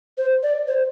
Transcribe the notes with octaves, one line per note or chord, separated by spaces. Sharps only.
C5
D5
C5